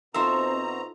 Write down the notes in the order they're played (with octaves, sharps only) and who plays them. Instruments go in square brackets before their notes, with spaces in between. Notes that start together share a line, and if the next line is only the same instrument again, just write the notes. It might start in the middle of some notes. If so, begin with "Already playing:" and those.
[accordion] B2 A#5 [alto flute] C4 [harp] D#4 F4 A4 [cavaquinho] C5 E5